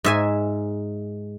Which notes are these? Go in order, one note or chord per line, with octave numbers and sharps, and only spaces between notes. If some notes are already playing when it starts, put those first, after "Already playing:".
G#2 E5 G#5